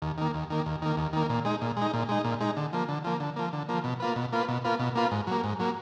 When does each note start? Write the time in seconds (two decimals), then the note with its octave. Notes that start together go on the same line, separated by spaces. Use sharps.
0.02 D#2
0.18 D#3 A#3
0.34 D#2
0.50 D#3 A#3
0.66 D#2
0.82 D#3 A#3
0.97 D#2
1.13 D#3 A#3
1.29 A#2
1.45 G#3 D#4
1.62 A#2
1.77 G#3 D#4
1.93 A#2
2.09 G#3 D#4
2.25 A#2
2.40 G#3 D#4
2.57 D3
2.73 F3 A#3
2.89 D3
3.04 F3 A#3
3.20 D3
3.36 F3 A#3
3.53 D3
3.69 F3 A#3
3.84 B2
4.00 A#3 F4 B4
4.16 B2
4.32 A#3 F4 B4
4.48 B2
4.64 A#3 F4 B4
4.79 B2
4.95 A#3 F4 B4
5.11 G#2
5.27 F#3 A#3
5.44 G#2
5.59 F#3 A#3